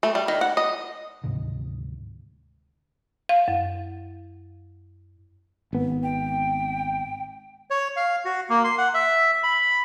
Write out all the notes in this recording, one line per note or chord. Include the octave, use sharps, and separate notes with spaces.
A3
G3
D#3
F#5
D#5
D2 G#2 C3 D#3
F5
F#2
G#1 B3
G5
C#5
F5
F#4
A#3
C6
F#5
E5
B5